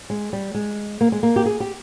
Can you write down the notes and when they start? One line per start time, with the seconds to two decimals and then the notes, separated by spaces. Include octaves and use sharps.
0.10 G#3
0.33 G3
0.54 G#3
1.01 A#3
1.12 G#3
1.23 A#3
1.36 G4
1.46 G#4
1.60 G4